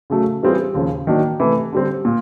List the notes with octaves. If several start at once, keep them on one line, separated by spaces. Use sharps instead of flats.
C#3 F#3 A3
E3 G3 C4 F4 G#4
D#2 C#3 F3
D#3 F#3 A#3 D4
C3 E3 A3
D3 G3 C4
A#2